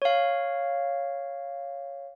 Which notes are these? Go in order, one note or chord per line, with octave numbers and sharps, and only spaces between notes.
C#5 F5